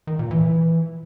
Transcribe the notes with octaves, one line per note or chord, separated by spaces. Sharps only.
D#3
A#2
E3